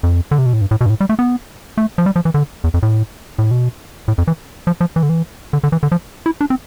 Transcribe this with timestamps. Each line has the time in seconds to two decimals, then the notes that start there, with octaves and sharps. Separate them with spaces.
0.03 F2
0.31 D3
0.38 C3
0.46 B2
0.53 A2
0.61 G2
0.71 A2
0.81 B2
0.86 G2
0.90 A2
1.01 G3
1.09 A3
1.19 B3
1.78 A3
1.98 F3
2.06 G3
2.16 F3
2.25 E3
2.34 D3
2.64 E2
2.74 F2
2.83 A2
3.39 A2
3.51 B2
4.08 A2
4.18 F2
4.28 E3
4.67 F3
4.81 F3
4.96 E3
5.03 D3
5.09 E3
5.53 D3
5.64 D3
5.72 E3
5.83 D3
5.92 F3
6.26 E4
6.41 D4
6.50 C4